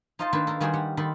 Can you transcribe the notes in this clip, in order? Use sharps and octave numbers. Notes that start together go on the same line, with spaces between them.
D#4 F4 C5 D#5 F5 A5
D#3 A#3 D4 B4 C5 A5
A4 A#4 F5
D#3 G3 F#4 G#4 G5 C6
G3 G4 F#5
D#3 A4 B5 C6